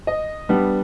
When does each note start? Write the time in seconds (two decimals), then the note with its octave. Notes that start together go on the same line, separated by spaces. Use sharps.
0.07 D#5
0.49 G3 B3 D4